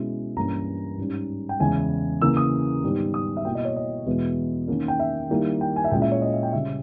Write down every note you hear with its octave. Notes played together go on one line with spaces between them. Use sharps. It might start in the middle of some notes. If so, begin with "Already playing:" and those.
Already playing: B2 G#3 C#4 E4
G2 E3 A#3 C#4 E4 A#5
G#2 G3 C#4
G5
E2 C#3 G#3 C#4 E4 G#5
C#3 E3 A#3 E6
D#6
G#2 D#3 G3 B3
D#6
E5
B2 A#3 E4 G5
D#5
C#5
D#5
E2 B2 G#3 B3 E4
D#3 A#3 C#4
G5
E5
D#3 G3 A#3 E4
G5
G#5
E5
A#2 G#3 C#4 E4 G5
E5
C#5
D#5
E5
G5
C#3 G3 C#4 E5